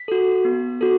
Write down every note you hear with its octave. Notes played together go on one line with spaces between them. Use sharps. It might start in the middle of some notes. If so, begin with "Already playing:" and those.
Already playing: B6
F#4 A4
B3
F#4 A4